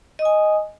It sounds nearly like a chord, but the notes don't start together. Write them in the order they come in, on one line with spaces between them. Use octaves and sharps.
D#5 D#6 G#5